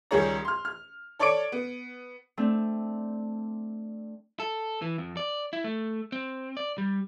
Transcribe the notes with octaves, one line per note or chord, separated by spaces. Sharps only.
C#2 D#3 G3 G#4 C#5 A#5
C6 F6
F6
A4 C#5 D5 C#6 D6 D7
B3
A3 C4 D4
A4
E3
F2
D5
E4
A3
C4
D5
G3